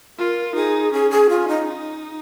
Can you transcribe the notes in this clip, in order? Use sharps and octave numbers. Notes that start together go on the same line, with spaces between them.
F4 A#4
D#4 G#4
C#4 G#4
G#4
C#4 F4
D#4
D#4